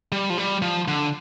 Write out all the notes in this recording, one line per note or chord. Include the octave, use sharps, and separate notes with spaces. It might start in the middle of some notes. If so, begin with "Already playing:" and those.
G3
F3
G3
F3
D3